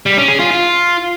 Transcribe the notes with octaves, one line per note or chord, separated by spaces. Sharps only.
G3
C#4
G#4
F4
F4